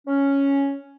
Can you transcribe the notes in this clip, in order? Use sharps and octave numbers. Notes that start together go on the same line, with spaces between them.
C#4